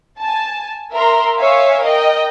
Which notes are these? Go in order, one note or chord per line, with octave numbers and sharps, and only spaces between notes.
G#5 A5
A#4 E5 A#5 C6
C#5 E5 F5 G#5
A#4 D#5 G5